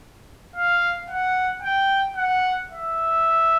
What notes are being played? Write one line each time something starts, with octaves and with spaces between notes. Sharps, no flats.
F5
F#5
G5
F#5
E5